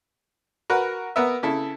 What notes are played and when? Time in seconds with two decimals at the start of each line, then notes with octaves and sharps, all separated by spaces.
0.70 F#4 A#4 B4
1.16 B3 A#4 E5
1.43 C#3 E4 A4